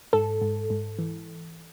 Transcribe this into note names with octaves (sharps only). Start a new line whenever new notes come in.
G#2 A4
G#2
G#2
E3